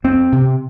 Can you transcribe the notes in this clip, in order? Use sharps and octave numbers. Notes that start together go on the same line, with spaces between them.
F2 C4
C3